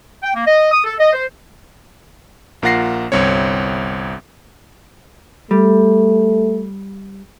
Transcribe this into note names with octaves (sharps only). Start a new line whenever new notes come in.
G5
A#3
D#5
D#6
A4
D#5
C5
A#1 A#3 F4 F#5 A#6 C7
G1 C2 C4 C#5
G3 A3